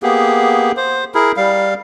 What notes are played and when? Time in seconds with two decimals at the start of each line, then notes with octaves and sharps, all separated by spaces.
0.03 A#3 B3 G4 G#4
0.77 C5
1.15 E4 G#4 A#4
1.37 G3 F5